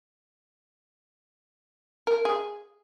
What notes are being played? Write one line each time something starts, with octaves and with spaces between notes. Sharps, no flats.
A#4
G#4